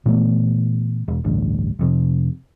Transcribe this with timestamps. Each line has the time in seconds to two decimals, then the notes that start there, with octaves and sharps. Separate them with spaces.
0.06 A#2 E3 A3 B3
1.08 E1
1.24 A1 D2 G2
1.79 F1 F2 C3